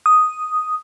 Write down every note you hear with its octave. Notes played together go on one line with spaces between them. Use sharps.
D#6